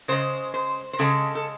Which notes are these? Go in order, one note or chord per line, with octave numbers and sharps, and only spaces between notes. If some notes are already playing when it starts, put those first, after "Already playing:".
C#3 G#3 C5
C5
C5
C#3 G#3 A4
A4